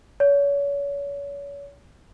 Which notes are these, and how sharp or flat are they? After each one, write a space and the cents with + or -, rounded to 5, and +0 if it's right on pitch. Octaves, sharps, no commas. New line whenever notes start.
C#5 +35